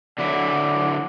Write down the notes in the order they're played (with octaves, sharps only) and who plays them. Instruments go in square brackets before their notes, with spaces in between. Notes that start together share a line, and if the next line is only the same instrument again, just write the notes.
[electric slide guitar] D3 F#3 E4 [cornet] D5